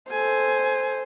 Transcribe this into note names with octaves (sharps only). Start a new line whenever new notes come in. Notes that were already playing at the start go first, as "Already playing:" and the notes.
A4 C5 G#5